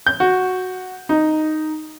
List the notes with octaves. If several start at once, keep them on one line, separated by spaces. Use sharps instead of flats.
G6
F#4
D#4